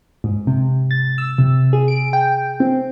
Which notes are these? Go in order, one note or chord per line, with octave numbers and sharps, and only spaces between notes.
G#2
C3
A6
E6
C3
G#4
D7
G5
C4